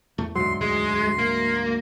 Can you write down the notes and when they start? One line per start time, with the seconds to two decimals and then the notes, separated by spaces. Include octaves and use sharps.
0.18 E2 A3
0.35 D2 G#2 F#3 C6
0.61 G#3 C6
1.18 A#3